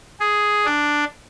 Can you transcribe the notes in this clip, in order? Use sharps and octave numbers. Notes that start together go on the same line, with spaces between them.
G#4
D4